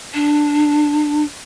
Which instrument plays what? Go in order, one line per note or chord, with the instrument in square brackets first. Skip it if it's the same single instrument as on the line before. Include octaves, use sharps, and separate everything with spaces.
[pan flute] D4